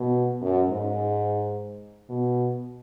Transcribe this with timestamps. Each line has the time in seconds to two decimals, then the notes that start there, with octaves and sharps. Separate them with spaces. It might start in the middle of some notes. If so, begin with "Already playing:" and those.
Already playing: B2
0.41 F#2
0.70 G#2
2.10 B2